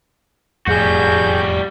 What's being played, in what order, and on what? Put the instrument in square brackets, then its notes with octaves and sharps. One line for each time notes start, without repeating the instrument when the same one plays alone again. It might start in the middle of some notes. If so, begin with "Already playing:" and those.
[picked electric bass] E1 F2 A2 [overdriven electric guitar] G3 F#4 [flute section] G#4 C#6 G6